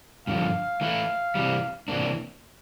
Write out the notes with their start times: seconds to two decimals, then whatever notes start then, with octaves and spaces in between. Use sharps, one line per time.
0.27 G2 D3 F3 F5
0.81 E3 A3 E4
1.35 C3 E3 G3
1.88 C3 E3 A#3 D4